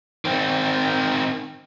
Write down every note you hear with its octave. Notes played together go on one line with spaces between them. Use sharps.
D#3 C4